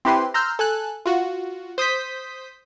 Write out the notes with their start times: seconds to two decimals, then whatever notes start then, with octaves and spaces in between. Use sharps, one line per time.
0.05 C4 E4 G4 B4 C6
0.34 A#5 C6 E6 F6 G6
0.59 A4 G#5 F#6
1.06 F4 F#4
1.78 C5 D#6 G6 B6